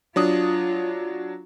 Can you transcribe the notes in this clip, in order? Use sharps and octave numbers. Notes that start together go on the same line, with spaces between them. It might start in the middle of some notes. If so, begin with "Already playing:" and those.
F#3 D4 F4 D#6